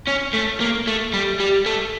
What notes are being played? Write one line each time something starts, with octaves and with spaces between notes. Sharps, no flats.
C#4
A3
A#3
A3
G3
G3
A3